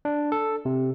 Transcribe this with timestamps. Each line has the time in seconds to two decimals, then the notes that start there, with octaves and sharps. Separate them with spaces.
0.05 D4
0.32 A4
0.65 C3